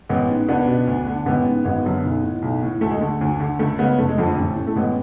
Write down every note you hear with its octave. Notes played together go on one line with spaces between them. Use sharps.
A1 G#3 B3
G#2
C#2 B3 D4
B2
D2
D3
A1 G#3 B3
G#2
G#1 G#3 B3
F#2 D3
B1
A2
B1
A2
D2 A3
G#3
D3 A3
D2
D3
C#2 A3
C#3 G#3 B3
F1 A3
G#3
F2 D3 A3
A1
A2
A3
A1 G#3 B3